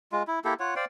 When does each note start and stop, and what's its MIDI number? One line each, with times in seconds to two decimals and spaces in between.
0.12 0.23 56
0.12 0.23 65
0.28 0.39 64
0.45 0.54 58
0.45 0.54 64
0.45 0.54 67
0.45 0.54 69
0.60 0.74 65
0.60 0.74 73
0.60 0.74 78
0.76 0.85 72
0.76 0.85 74
0.76 0.85 77
0.76 0.85 79